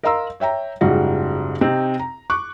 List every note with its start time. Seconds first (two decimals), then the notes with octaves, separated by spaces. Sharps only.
0.03 A#4 D#5 F5 A#5 C6 E6
0.40 C#5 E5 G5 A#5
0.81 F#1 G#2 G3 F4 F#4
1.61 C3 C4 D#4
1.99 A#5
2.30 C#6 D6 F#6